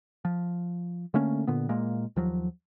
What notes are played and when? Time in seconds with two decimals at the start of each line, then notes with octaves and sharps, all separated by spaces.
0.25 F3
1.14 D3 A3 A#3 C#4
1.47 A#2 D3 B3
1.69 A#2 G#3 A#3
2.16 D#2 F3 F#3